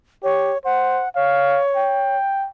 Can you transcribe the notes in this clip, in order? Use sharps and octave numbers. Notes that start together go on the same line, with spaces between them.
G4 C#5
C5 F#5
C#5 F5
G5